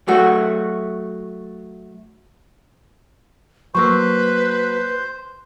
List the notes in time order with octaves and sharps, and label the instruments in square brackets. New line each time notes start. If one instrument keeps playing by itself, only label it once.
[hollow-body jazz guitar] F#3 A3 F#4
[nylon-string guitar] F#3 A#3 [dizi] B4 [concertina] C5 [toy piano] C#6 E6